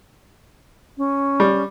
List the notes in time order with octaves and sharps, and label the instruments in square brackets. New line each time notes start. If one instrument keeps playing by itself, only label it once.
[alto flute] C#4
[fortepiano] G3